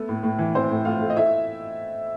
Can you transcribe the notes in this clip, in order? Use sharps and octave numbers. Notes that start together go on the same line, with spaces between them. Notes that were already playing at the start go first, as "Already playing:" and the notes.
Already playing: A3 B3
A2
A2
E3
E3 C4 C5
A2
A2 F4 F5
A3
D#5
A3 E4 E5